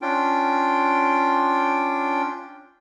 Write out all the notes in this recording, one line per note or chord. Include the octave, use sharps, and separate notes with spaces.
C#4 D4 F4 G5